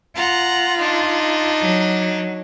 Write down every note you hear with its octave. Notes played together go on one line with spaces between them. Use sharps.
F4 F#5 A#5
D4 D#4
F#3